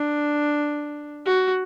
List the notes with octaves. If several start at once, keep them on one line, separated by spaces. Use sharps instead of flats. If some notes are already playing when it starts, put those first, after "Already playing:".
Already playing: D4
F#4